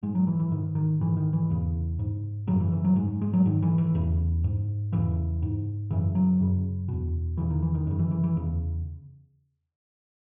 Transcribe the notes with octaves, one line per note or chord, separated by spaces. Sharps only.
G#2 G#3
F#3
E3
E3
G#2 D#3
D#3
G#2 E3
D#3
E3
E2 C#3
G#2
F#2 C#3 F#3
E3
E3
F#3
G#2 G#3
G#3
F#3
G#2 D#3
E3
E3
E2 C#3
G#2
E2 C#3 E3
G#2
F#2 C#3 E3
F#3
F#2 C#3
E2 B2
E2 C#3 E3
D#3
E3
D#3
F#2 C#3 D#3
E3
E3
E3
E2 C#3